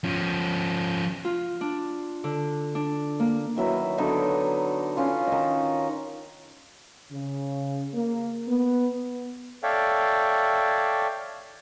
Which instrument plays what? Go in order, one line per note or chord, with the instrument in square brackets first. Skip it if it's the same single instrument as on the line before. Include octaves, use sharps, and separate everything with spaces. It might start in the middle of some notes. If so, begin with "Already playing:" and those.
[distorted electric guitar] F3 C#4
[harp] F4
D4
D3
D4
A#3
[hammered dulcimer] D#3 F#3 E4 B4
D3 F#3 B3 D#4
C#4 F4 C6
D#3 D#5
[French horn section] C#3
A#3
B3
[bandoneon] A4 C#5 D5 E5 F5 G5